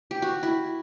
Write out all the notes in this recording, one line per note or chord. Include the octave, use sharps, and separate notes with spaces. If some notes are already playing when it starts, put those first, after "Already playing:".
G4
F#4
E4